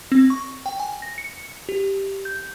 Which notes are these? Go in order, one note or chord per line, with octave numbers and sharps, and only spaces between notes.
C4
C#6
G5
G#5
A#6
C#7
G4
G6